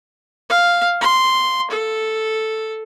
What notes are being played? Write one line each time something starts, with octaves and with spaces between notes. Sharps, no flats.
F5
C6
A4